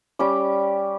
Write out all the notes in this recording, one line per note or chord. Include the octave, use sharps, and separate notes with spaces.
G3 C#4 G5 D6